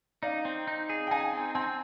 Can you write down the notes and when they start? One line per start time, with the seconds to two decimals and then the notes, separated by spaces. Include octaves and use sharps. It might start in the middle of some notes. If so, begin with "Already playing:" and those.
0.23 D#4 D5 F5
0.45 C4
0.67 D#4
0.89 G#4
1.07 G5
1.11 D#4 F5 G#5
1.33 C4
1.55 C4 G#5 C6